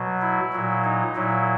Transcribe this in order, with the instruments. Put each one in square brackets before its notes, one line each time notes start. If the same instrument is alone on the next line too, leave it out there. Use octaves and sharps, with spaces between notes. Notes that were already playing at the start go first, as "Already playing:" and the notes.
Already playing: [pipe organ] B2 F#3
E4
A#2 F#3
D#4
A#2 F#3 E4